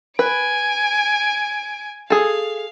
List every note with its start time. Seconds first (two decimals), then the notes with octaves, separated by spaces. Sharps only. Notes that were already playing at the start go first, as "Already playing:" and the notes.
0.19 B4 G#5 D7
2.10 G#4 A4 F5